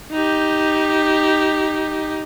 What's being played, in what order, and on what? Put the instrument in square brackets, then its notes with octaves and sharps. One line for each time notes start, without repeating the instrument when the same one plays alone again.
[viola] D#4 G4